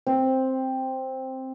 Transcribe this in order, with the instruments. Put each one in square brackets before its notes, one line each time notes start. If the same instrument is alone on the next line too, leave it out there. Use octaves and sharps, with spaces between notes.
[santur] C4